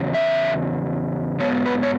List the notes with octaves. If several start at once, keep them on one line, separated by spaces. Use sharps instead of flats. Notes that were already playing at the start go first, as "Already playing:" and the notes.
Already playing: E2 C#3 F#3
E5
G#2 F#3 B3 C#5
B4
C#5